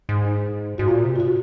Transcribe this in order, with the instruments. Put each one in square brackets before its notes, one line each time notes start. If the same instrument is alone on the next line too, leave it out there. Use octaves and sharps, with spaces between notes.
[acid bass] G#2
[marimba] D#4
[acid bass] G#2 [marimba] F#4
[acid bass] A#2 [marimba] F4
[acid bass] C3
[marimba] F4
F#4